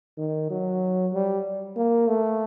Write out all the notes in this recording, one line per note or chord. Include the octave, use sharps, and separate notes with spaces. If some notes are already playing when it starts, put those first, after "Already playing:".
D#3
F#3
G3
A#3
A3